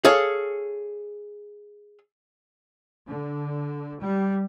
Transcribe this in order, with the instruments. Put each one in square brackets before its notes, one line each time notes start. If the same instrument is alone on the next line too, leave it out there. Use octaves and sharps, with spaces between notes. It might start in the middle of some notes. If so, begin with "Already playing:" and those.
[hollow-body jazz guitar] G#4 A4 C#5 F5
[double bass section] D3
G3